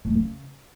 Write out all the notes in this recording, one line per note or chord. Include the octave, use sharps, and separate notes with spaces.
E2
A2
C#3